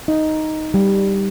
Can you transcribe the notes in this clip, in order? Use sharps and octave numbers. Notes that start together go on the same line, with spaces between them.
D#4
G3